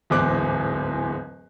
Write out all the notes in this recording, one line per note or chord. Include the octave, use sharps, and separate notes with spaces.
D1 E2 G#2 D6 F#6